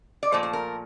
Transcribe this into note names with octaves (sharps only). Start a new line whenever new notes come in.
D5
A#2 F3 A3 C5
C5
A#4